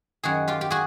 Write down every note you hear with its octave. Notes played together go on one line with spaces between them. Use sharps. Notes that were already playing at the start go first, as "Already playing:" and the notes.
F#2 D#3 F#4 G#4
F4 G4
G4
F#4 G#4